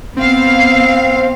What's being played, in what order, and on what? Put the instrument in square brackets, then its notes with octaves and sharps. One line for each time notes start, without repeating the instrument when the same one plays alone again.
[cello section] B3 F5 [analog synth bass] C4